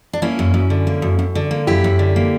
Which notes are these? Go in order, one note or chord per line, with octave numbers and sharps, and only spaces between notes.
D4
A#3 C#4 E4
F#2
F#2
D3
A#3
F#2
F#2
D3
A#3
F#2 E4 G4
F#2
D3
A#3